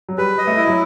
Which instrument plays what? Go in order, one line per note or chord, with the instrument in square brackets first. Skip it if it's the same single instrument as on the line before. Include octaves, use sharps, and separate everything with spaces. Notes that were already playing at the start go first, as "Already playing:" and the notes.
[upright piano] F#3
[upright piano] G3 [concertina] B4
[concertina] D#5
[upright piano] A3
[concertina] E4
[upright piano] F#3